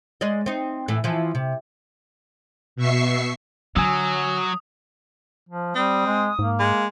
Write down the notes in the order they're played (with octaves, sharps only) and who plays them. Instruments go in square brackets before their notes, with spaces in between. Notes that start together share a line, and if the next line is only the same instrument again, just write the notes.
[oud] G#3 D5 D#5
C4 D#4
A2 E3
E3 F3
C3
[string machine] B2 E5 C#6 C7
[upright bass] D3 [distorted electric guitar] F#3 [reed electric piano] G#5 E6 [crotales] D#6
[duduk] F3
[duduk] G3 [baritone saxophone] C4 [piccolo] D#6
[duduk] G#3
[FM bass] G#2 [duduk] A#3
[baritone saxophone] G#3